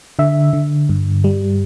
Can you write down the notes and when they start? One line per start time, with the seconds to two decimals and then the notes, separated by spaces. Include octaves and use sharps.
0.19 D3 E5
0.53 D3
0.89 G2
1.24 G3